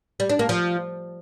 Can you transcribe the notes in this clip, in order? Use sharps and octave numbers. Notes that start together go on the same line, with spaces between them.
G3
D4
A#3
F3